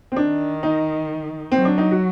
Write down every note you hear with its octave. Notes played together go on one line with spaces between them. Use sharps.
C4
D#3 D4
D#4
C4
F#3
D4
D#4
F#4